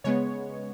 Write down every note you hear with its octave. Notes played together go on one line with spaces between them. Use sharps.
C#3 G#3 B3 C#5